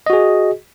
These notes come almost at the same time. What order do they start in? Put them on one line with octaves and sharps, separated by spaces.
D#5 F#4 G#4